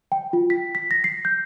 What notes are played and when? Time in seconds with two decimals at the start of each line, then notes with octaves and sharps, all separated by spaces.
0.12 G5
0.33 F4
0.50 B6
0.75 B6
0.91 A#6
1.04 C7
1.25 G6